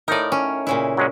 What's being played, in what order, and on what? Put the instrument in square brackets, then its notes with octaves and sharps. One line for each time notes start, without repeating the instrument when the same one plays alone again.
[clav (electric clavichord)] A2 D#4 [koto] A#4 D5
[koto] C#4
A#2 C#3 E4
[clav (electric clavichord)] F#3 G#3 C#4